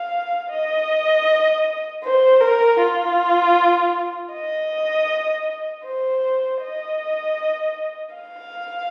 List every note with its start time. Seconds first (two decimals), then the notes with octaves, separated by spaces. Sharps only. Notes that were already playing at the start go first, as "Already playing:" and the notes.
Already playing: F5
0.50 D#5
2.04 C5
2.41 A#4
2.79 F4
4.33 D#5
5.86 C5
6.62 D#5
8.15 F5